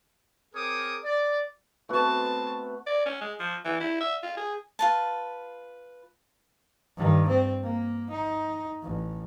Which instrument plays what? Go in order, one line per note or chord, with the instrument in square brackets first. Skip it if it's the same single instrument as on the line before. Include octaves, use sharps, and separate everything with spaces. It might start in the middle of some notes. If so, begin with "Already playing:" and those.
[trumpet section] C4 G#4 A#4 C#5 D6 D#6
D5
[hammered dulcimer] A3 B3 F#4 [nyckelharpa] C4 A5
[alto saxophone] D5
C#4
G#3
F3
E3
E4
E5
F4
G#4
[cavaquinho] F4 B4 A5
[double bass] G2 D#3
C4
A#3
D#4
A1